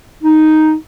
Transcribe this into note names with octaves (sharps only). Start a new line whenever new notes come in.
D#4